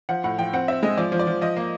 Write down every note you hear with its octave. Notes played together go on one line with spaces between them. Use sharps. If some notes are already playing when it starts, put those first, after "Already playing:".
F3 F#5
A2 F#5
F3 G5
C4 F#5
C4 E5
G#3 D#5
F3 D5
F3
D5
F3
F3 D#5
A#3